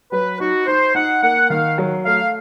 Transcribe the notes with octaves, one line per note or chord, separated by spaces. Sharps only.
F#3 B4
D#4 F#4
D#4 C5
D#4 F#5
A#3 F#5
D#3 F5
F#3
A3 F5